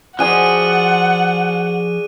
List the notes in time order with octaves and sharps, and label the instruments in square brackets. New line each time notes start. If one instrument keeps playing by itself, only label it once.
[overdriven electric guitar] F3 [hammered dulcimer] F#4 G#4 D5 [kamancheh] F#5 [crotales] F#6 D#7